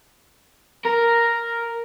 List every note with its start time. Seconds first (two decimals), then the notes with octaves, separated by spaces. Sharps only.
0.85 A#4